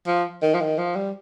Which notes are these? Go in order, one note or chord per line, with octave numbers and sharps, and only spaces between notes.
F3
D#3
F3
D#3
F3
G3